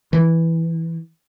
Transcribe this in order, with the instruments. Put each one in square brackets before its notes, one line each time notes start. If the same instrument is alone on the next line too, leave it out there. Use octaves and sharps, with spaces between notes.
[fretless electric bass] E3